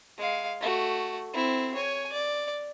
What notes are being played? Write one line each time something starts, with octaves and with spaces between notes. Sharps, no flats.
G#3 F5
A3 F#4
C4 E4
C#5 G#5
D5